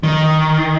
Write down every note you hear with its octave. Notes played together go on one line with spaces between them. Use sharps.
D#3